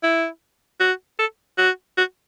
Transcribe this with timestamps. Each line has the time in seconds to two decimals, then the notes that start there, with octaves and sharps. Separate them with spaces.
0.03 E4
0.80 F#4
1.19 A4
1.58 F#4
1.98 F#4